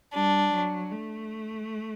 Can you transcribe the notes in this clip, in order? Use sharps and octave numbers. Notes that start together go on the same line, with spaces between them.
G3 D4
F#3
A3